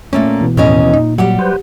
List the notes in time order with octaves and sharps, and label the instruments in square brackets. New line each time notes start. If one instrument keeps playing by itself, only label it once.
[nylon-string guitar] A#2 A3 A#3 [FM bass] C#4
[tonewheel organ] B2 E3
[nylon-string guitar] D#2 C#4 D#5 [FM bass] A2
[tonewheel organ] A#2 [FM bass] D#4
[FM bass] F#3 [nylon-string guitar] G3 G4 F#5
[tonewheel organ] B4 C5